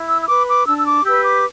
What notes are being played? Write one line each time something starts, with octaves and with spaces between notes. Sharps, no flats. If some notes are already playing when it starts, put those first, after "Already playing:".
Already playing: E4
E6
E6
B4 D6
D6
D4 E6
E6
D6
G4 B4 E6
D6